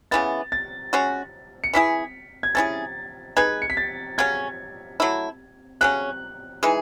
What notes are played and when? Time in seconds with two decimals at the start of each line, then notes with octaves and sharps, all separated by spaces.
0.11 C#3 E3 B3 A6
0.52 A6
0.93 G#3 C#4 F#4
1.64 C#7
1.73 E3 A3 E4 G#4 B6
2.43 G#6
2.55 A3 C#4 E4 G#4 A6
3.37 G#3 D#4 G#4 B4 G#6
3.62 C#7
3.70 B6
3.77 A6
4.18 C#3 F#3 C#4 G#6
5.00 F#3 A3 E4
5.81 C#3 F#3 C#4 F#6
6.63 E3 G#3 D#4 G#4